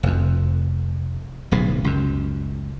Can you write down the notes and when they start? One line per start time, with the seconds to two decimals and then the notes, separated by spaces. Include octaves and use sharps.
0.03 F1 F2
1.51 D1 B1 G#2
1.84 C#2 F#2